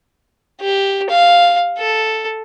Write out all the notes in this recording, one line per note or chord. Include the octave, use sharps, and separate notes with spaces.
G4
F5
A4